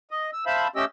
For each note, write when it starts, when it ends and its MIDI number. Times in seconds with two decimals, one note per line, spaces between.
0.11 0.31 75
0.33 0.45 88
0.46 0.68 72
0.46 0.68 76
0.46 0.68 77
0.46 0.68 81
0.46 0.68 83
0.76 0.85 57
0.76 0.85 61
0.76 0.85 67
0.76 0.85 75
0.76 0.85 88